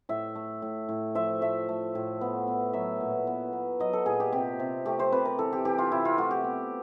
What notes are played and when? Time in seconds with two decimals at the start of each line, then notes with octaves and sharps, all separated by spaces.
0.09 A2 E5
0.35 A3
0.62 A2
0.89 A2
1.15 F3 E5
1.41 A3 E5
1.69 A3
1.95 A2
2.21 B3
2.48 B3
2.73 F#3 E5
3.01 A#2
3.27 B3
3.53 B3
3.80 F#3 D#5
3.93 A4
4.06 A#2 G#4
4.20 G4
4.32 C3 G4
4.60 C3
4.85 A3 G4
4.99 C5
5.12 C3 B4
5.25 A#4
5.39 E3 A4
5.52 G4
5.65 E3 G4
5.78 F4
5.92 C3 E4
6.05 F4
6.18 A3 F#4
6.31 G4
6.44 B3